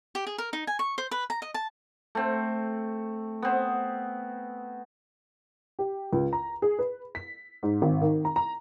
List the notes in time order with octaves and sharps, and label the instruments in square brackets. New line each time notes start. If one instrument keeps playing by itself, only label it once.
[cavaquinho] G4
G#4
A#4
D#4
G#5
C#6
C5
B4
A#5
D#5
A5
[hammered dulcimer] A3 C4
B3 C4
[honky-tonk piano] G4
C#2
A#5
G#4
B4
B6
G#2
G#1
D#3
A#5
A#5